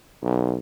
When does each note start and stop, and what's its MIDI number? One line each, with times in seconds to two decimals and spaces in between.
0.22 0.58 35